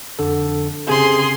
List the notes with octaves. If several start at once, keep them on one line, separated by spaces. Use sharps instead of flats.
F2 D3 A4
C#3 C4 G4 G#4 C6